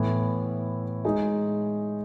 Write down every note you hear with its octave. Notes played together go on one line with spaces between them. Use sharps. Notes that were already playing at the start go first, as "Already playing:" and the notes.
Already playing: A2 E3 B3 E4
G#3 D#4 G#4